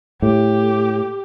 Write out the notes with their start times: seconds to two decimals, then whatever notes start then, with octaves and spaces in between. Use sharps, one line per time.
0.22 A2 G4